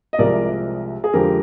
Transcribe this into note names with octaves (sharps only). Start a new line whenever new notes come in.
D#5
C2 C3 F3 G#3 A#4 D5
G#4
F2 D3 F3 G#3 G4 A#4